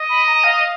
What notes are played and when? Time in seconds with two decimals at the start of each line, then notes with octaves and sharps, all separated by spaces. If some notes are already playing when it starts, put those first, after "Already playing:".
Already playing: D#5
0.09 B5
0.26 A#5
0.44 F5